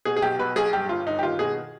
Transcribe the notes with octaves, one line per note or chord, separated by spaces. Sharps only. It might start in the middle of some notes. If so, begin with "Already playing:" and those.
B2 G#4
G#4
B1 G4
B2 B4
B1 G#4
G2 G4
G1 F4
G1 D#4
G4
D#3 F4
B2 G#4